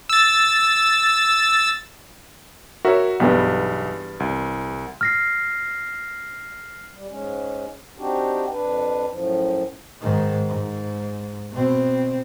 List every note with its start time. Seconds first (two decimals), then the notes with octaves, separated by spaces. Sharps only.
0.09 E6 A6
2.85 F#4 A#4 C#5 E5
3.20 B1 E2 G2 B3
4.20 C2
5.01 F6 A#6 C7
6.93 G3
7.09 G#2 G#3 C#4
7.98 C4 D4 D#4 F#4 G4
8.51 F2 D4 B4
9.09 F#2 A2 F3
10.01 G#2 D#3
10.48 G#2
11.52 B2 C4